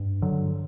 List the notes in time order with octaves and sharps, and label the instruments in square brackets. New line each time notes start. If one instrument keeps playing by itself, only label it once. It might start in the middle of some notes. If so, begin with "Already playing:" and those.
Already playing: [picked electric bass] G2
D3 F#3